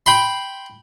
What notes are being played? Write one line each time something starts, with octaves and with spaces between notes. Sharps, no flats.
G5 B5 C6